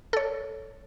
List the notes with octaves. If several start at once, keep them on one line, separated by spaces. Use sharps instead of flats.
A4 C#5